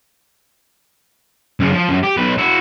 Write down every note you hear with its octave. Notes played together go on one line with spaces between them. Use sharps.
F#2 C#3
F3
F#2
G4
B1 B4
E4 F#4